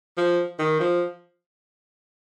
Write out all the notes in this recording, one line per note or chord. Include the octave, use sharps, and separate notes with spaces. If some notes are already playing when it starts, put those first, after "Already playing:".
F3
D#3
F3